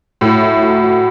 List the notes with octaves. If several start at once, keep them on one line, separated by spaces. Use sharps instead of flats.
A2 F#3
A3
F#3
F#3